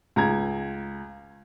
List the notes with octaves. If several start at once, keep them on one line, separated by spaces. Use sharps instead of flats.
C#2 A#5 G#6